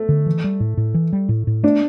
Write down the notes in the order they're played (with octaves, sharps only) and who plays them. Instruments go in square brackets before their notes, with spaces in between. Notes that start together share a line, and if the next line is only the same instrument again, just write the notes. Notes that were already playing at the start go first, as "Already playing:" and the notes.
Already playing: [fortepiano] A3
[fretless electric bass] D3
E3
G3
A2
A2
E3
G3
A2
A2
[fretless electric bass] A3 [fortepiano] D4